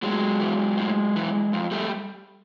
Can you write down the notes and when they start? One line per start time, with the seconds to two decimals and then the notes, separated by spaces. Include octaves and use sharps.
0.02 A2 F#3 G#3
0.41 E3
0.77 A2
1.16 E3
1.53 F2
1.71 G3 A3